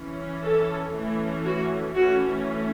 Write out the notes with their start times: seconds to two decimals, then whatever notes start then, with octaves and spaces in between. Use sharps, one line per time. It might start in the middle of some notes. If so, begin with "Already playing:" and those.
Already playing: E3 C#4
0.42 A4
0.93 E3 A3 C#4
1.44 F#4
1.95 E3 A3 C#4 F#4